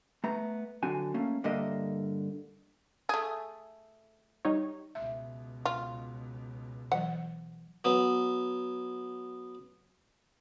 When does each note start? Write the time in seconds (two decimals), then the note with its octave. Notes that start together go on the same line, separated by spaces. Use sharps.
0.24 A3 B3 A#5
0.83 D3 F#3 C4 F#4 G#5
1.14 A3 A#3 C#4
1.44 G2 D3 A#3 A#4 D#5 E5
3.09 A3 G#4
4.45 G3 D#4 C#5
4.95 C#2 B2 E5
5.65 F4
6.92 E3 F#3 F#5
7.85 F#3 B3